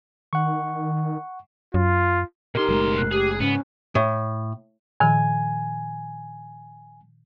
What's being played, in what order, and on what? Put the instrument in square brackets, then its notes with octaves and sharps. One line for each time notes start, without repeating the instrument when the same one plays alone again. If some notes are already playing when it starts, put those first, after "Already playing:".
[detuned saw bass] D#3 [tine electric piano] F#5 C#6
[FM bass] F#2 [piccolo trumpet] F4
[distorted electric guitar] B2 C6 [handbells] D#4 G4 A#4
[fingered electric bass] F#1 G#3 A3 [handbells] A#4
[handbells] F#6 C7
[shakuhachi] G4 [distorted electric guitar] G#4
[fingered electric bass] G#2 C#3 [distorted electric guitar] B3 [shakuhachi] C#4
[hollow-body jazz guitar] A2
[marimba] A#2 D#3 F3 [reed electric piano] G#5